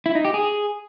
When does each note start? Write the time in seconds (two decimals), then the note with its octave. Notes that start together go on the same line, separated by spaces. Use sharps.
0.06 E4
0.15 D#4
0.25 G4
0.34 G#4